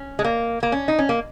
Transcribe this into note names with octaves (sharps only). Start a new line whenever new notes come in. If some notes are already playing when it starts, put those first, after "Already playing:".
Already playing: C#4
G#3
A#3
A#3
C#4
D#4
C#4
A#3